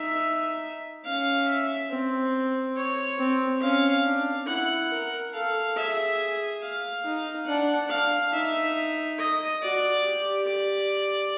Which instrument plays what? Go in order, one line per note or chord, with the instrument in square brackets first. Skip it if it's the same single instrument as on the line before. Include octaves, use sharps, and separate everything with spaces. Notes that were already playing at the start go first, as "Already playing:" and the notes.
Already playing: [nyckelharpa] D#4 [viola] E5
[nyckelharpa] C#4 [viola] F5
[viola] E5
[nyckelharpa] C4
[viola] C#5
[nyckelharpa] C4
[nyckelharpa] C#4 [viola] F5
[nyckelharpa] D4
[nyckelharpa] E4 [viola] F#5
[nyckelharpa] A#4
[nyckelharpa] A4 [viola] F5
[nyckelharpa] G#4 [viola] E5
[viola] F5
[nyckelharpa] D#4
[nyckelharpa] D4 [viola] F#5
[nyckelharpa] D4 [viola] F5
[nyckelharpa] D#4 [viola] E5
[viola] D#5
[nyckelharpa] F#4 [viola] D5
[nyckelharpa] G4
[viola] D5